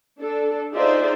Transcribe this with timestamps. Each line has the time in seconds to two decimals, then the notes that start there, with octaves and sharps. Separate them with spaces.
0.19 D4 A4
0.74 D#4 F4 G#4 C5 D5 E5